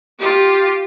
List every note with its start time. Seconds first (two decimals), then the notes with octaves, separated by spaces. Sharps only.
0.19 F4 G4